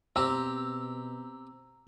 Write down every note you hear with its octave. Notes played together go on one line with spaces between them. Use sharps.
B2 C4 G4 A#5 E6